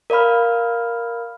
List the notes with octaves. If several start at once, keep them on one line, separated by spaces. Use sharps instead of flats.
A#4 D5 F5 B5 F6